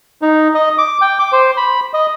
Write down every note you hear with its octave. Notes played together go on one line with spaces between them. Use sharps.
D#4
D#5
D6
G5
D6
C5
B5
D#5